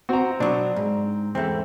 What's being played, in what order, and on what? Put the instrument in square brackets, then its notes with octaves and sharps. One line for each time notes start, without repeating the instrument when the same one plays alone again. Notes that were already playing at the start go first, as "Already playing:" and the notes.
[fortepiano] C4 A#5 [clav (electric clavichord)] F#4
[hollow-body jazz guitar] B2 F#3 [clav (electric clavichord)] D4
[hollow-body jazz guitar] G#2
[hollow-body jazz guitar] E2 G#2 A3 [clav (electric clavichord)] C4